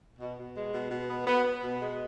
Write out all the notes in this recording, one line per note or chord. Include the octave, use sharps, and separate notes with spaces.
B2
B2
G#3
B2
B2
B3
B3
B3
B2
G#3